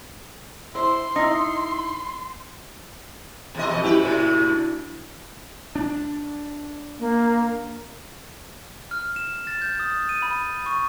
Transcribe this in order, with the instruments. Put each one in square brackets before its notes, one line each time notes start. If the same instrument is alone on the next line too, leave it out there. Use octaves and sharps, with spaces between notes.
[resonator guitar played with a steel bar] E4 C5 [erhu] C6
[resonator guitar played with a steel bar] D#4 E4
[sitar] E2 C3 D#5
[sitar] F2 B2 D#5 [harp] E5
[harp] C#4 E4 F#4 [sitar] G4 B4
[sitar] A2 C3
[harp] D4
[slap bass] D4
[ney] A#3
[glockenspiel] F6
E7
A6
G6
D#6
D#7
B5
C#6